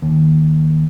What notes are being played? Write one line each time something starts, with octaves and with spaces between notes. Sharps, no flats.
D#2